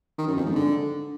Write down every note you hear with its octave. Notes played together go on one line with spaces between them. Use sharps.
D#3
F#2
F2
G#2
D3